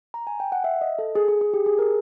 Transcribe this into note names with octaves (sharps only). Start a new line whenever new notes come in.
A#5
G#5
G5
F#5
E5
D#5
A4
G#4
G#4
G#4
G4
G#4
A#4